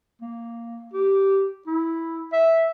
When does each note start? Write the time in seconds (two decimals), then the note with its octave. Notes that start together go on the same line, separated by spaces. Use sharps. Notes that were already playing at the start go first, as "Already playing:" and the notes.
0.22 A#3
0.93 G4
1.67 E4
2.33 E5